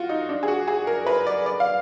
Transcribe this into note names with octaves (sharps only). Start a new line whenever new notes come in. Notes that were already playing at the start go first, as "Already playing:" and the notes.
Already playing: F4 F#4
D#4
D4
G#4
F#4
G#4
A#4
B4
D5
D5
F5